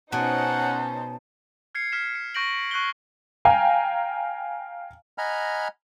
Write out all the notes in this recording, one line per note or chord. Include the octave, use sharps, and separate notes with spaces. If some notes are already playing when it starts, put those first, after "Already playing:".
B2 C#4 D#4 C5 F#5 A5
F6 G#6 C7 C#7
F6 B6 E7
C#7
C#6 G6 A#6 D7 F#7
C#6 F#6 G6 C7 G7
F5 G5 G#5 A#5
D#5 F#5 G#5 A#5 B5 F6